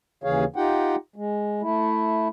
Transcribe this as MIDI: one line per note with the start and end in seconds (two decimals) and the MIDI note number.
0.24 0.44 39
0.24 0.44 49
0.24 0.44 52
0.24 0.44 68
0.24 0.44 73
0.24 0.44 77
0.56 0.96 63
0.56 0.96 65
0.56 0.96 67
0.56 0.96 78
0.56 0.96 79
1.16 1.62 56
1.62 2.28 57
1.62 2.28 64